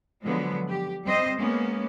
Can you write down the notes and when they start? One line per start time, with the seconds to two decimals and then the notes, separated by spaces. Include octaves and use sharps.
0.25 D3 F3 F#3 G#3 B3
0.70 G4
1.05 G3 C4 C5 D#5
1.37 G#3 A#3 B3 C#4